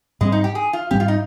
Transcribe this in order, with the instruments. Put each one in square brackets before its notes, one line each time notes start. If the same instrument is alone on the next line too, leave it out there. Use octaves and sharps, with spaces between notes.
[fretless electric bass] G#2 G3 C4 [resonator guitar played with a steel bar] G#3
[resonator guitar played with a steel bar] D#4
G4
G#4
F4
[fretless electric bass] G#2 G3 C4 [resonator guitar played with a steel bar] G4
[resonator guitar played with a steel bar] F4
D#4